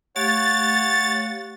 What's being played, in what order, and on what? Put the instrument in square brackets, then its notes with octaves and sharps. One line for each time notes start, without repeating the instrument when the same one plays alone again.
[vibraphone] A3 G4 F5 [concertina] C#5 F#5 [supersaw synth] A6